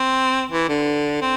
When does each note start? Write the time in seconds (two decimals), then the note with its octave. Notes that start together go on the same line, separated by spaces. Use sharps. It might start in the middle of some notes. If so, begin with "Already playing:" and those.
Already playing: C4
0.51 E3
0.69 D3
1.22 C4